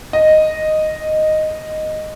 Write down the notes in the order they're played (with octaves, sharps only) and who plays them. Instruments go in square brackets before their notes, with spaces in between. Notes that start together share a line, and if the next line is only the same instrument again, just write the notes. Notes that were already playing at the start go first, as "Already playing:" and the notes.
[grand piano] D#5